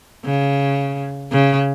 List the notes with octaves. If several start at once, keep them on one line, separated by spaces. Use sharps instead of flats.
C#3
C#3